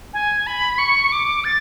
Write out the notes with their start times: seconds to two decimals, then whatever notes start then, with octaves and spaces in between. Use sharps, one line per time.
0.13 G#5
0.47 B5
0.78 C#6
1.12 D6
1.44 A6